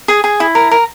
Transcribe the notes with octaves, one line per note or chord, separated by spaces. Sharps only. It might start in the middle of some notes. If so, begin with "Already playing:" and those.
G#4
G#4
E4
A#4
A#4